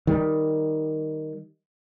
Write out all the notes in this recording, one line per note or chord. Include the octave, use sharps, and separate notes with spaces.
D#3 G3